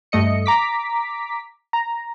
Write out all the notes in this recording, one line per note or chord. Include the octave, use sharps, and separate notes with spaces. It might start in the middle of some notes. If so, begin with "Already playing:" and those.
G2 A3 D#5 C#7
A#5 D6 B6
A#5